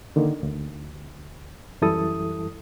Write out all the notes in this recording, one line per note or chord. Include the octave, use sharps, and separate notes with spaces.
D3 D#3 A#3
D2
F#2 E3 G3 E4 A4 D#6